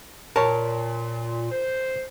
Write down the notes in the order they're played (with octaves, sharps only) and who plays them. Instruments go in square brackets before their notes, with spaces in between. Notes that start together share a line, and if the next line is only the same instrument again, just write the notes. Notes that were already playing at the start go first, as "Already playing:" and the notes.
[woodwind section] A#2 [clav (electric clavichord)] A#4 C#5 [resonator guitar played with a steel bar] A5
[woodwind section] C5